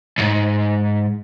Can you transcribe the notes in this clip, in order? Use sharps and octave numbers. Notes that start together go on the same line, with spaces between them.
C2 G#2